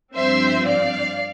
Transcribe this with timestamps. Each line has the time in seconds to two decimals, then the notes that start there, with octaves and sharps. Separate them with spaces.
0.15 G2 F3 C4 C5 E5
0.66 D5 F5